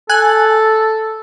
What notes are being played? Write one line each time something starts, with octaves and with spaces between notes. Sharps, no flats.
A4 G#5 F#6